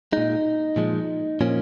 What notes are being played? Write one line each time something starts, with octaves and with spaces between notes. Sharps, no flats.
A#2 G#3 D#4
A#2 F3 G#3
A#2 F3 A#3 C#4